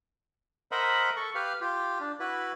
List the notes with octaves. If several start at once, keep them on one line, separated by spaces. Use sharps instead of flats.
A#4 C5 D#5 E5 F#5 B5
A4 C#6
G4 B4 F5
F4 G4
D4
E4 F#4 B4